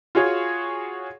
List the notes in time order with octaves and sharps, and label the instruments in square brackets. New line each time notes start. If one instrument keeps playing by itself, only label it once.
[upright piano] F4 F#4 G#4 C#5